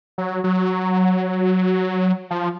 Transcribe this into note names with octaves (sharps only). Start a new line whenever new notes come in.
F#3
F#3
F3